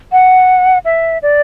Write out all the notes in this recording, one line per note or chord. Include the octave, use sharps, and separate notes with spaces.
F#5
E5
D5